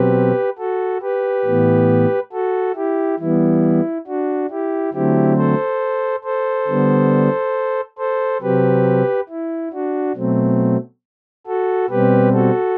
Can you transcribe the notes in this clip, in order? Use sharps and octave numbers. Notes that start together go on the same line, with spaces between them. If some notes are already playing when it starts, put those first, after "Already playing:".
Already playing: B2 F#3 C4 G4 B4
F#4 A4
G4 B4
A2 E3 B3
F#4 A4
E4 G4
E3 G3 B3 E4
D4 F#4
E4 G4
D3 F#3 A3 C4 E4 G4
A4 C5
A4 C5
D3 G3 B3
A4 C5
C3 F#3 C4 G4 B4
E4
D4 F#4
B2 F#3 A3 C4
F#4 A4
B2 G3 C4 G4 B4
F#4 A4